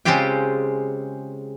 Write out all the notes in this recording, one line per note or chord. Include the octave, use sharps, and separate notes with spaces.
C#3 G#3 C4 F4 G4 G5